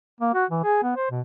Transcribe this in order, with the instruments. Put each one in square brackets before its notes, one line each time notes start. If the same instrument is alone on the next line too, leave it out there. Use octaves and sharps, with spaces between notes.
[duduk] A#3
F#4
E3
G#4
B3
C5
B2